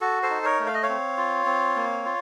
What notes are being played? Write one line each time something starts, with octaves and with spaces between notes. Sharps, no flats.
F#4 A4
A4 C5
D#4
A#4 C#5
A3
F5
D#5
C#5 F5
C4
F4
C4
A#3
F4